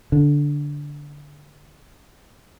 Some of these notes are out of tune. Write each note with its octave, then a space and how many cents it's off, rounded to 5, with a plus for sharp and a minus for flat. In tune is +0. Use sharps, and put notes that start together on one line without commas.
D3 -10